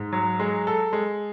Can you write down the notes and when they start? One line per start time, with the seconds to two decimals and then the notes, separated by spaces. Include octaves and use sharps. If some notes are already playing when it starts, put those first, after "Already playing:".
Already playing: G#2
0.13 F#3
0.40 G#3
0.67 A4
0.93 G#3